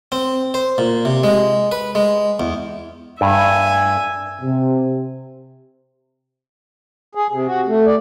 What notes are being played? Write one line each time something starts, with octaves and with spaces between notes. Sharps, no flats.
C4
C5
A#2
C3
G#3
B4
G#3
E2
G2 E5 G#5
C3
G#4
C3
F#4
A3
D5